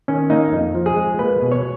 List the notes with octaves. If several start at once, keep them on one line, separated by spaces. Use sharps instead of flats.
D#3 C#4
A#3 D#4
F2
F3
G#4
G#3
A#3 B4
B2
C#5